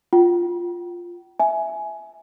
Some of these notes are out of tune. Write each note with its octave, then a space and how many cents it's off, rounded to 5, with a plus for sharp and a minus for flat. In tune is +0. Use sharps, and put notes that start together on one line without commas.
F4 +0 G5 -40
E5 -5 G#5 +15